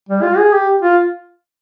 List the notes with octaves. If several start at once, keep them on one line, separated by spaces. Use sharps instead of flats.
G3
F4
G#4
G4
F4